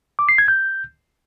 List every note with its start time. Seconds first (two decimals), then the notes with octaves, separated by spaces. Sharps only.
0.19 D6
0.29 C7
0.38 G#6
0.48 G6